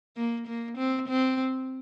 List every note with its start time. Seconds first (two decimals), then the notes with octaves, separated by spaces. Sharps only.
0.17 A#3
0.47 A#3
0.77 C4
1.08 C4